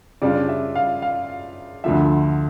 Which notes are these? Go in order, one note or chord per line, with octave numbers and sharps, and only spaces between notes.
C#3 G3 D4 F4 D5
E5
F5
F5
D2 D3 F3 E5